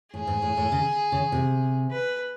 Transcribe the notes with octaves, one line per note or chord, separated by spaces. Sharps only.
A2 G#4
G#2
A2
A2
C#3
C#3
C3
B4